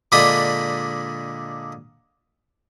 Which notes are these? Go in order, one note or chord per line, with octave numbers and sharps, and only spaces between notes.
A#2 D3 G#3 D4 B5 D#6